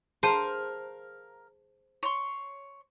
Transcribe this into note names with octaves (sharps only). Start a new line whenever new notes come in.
G#4 A#4 C5 F5 A5
C#5 C6